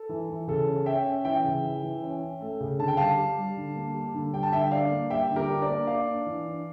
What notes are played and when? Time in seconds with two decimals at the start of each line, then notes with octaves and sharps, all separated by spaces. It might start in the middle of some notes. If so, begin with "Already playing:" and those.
Already playing: A4
0.09 E3
0.29 E3
0.47 C#3 A4
0.67 C#4
0.86 C#4 E5 G5
1.05 C#4
1.25 E3 E5 G5
1.44 C#3
1.63 E3
1.83 E3
2.03 C#4
2.22 C#4
2.41 A3
2.60 C#3
2.79 D3 A5
2.88 G5
2.97 G3 F5 A5
3.17 G3
3.37 G3
3.57 D3
3.76 A#3
3.94 G3
4.14 D3
4.34 G3 G5
4.43 A5
4.52 D3 E5 G5
4.71 D4 D5 F5
4.91 A#3
5.10 G3 E5 G5
5.30 D3
5.36 G4 A#4
5.49 D4
5.62 A#4 D5
5.69 A#3
5.87 D4 D5 F5
6.07 D4
6.26 E3
6.46 D4